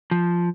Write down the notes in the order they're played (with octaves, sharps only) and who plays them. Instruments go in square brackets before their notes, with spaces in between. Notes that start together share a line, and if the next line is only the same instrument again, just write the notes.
[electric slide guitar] F3